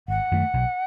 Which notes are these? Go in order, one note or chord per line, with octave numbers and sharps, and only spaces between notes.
G#1 F#5
F#2 D#3 A3
B1